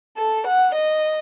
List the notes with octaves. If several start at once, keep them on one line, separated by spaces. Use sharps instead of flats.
A4
F#5
D#5